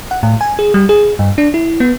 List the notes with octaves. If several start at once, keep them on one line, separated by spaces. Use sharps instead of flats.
F#5
A2
G#5
G#4
G3
G#4
G2
D4
E4
B3